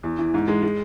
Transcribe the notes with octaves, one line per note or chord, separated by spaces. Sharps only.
E2
E3
G#2
G#3
G#3